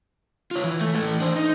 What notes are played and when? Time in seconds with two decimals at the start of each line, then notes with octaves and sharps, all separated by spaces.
0.51 F4 C#5
0.64 E3
0.81 A3
0.95 E3 A4
1.20 D4 C5
1.36 D#4